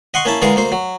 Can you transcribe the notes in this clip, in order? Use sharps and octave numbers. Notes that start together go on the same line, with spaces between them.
D#5 F#5 C6 C#6
A#3 C#4 E4 A5
D3 E3 G#3 A#4 F5
D2 A#3 C5
F#3